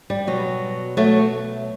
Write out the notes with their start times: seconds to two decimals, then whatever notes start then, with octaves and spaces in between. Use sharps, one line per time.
0.10 G3
0.27 B2 F#3
0.97 F#3 A3